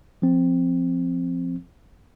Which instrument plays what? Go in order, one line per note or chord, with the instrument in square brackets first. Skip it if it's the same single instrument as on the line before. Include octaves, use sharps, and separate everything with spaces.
[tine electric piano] F3 C4